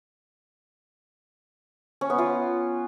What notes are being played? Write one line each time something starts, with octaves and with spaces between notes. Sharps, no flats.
C#4
B3
F4